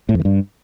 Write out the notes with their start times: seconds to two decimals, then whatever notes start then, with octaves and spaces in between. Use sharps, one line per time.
0.09 A2
0.14 F2
0.20 E3
0.25 G2